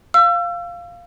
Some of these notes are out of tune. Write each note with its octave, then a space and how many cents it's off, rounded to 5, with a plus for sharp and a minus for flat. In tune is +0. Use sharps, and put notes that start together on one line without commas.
F5 +0 E6 +35